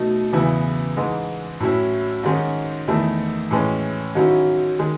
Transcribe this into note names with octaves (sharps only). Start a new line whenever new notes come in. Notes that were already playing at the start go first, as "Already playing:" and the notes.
Already playing: B2 F#3 A3 D#4
E2 C#3 E3 B3 E4
G#2 E3 G#3
A2 F#3 C#4 E4
G#2 D#3 G#3 C#4
E2 D#3 A3 E4
A2 E3 G#3 C#4
G#2 D#3 F#3 C#4 E4
D#3 G#3